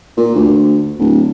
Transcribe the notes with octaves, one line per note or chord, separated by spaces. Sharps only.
A#2
D2
D1